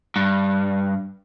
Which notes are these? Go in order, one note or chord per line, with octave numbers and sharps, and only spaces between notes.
G2